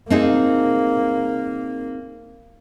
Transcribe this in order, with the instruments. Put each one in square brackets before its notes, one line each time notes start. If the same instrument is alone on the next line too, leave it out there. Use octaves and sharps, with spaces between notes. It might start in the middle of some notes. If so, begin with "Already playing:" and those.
[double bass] A#3 [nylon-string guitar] C4 D#4 G#4